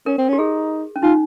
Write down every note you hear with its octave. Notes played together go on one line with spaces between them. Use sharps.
C#4 A#4
C4
C#4
G4
D#4 G#4
C#4
D#4 F4